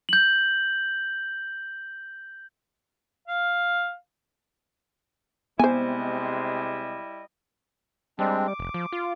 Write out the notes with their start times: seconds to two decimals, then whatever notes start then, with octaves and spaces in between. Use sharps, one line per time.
0.09 G6 F#7
3.28 F5
5.59 C3 G3 G#3 B3 E4 C5 D#5 G#5
8.19 G3 G#3 C4 D4
8.47 D6
8.59 F1
8.74 F3
8.93 F4